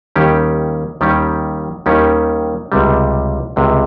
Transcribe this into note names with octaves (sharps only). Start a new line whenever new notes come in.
D#2 D#3 G3 C#4 G4
D#2 D#3 G3 C#4 G4
D#2 D#3 G3 C#4 G4
C#2 C3 G3
C#2 C3 G3